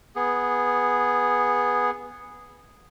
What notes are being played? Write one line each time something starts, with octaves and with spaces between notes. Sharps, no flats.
B3 G#4